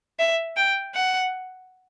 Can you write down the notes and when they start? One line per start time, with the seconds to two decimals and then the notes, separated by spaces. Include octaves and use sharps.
0.19 E5
0.57 G5
0.95 F#5